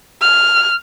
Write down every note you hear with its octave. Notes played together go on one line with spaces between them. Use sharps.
F6